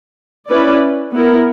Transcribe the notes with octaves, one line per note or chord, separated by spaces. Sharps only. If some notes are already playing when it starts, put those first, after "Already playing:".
C#4 E4 B4 D5
B3 E4 A#4